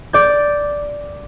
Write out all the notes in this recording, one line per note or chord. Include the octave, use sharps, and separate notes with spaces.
D5 G6